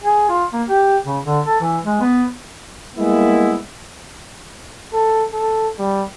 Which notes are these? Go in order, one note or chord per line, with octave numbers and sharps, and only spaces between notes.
G#4
F4
A#3
G4
C#3
D3
A4
E3
G#3
B3
G3 G#3 A#3 B3 E4
A4
A4
G3